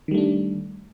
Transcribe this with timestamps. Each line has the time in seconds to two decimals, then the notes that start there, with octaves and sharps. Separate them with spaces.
0.08 D#3
0.11 G3
0.14 A3
0.18 D4